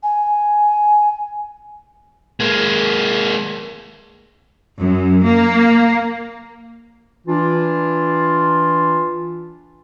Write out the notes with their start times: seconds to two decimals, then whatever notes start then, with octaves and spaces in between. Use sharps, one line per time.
0.03 G#5
2.40 G#3 A#3
4.79 F#2
5.24 A#3
7.27 E3 D4 F4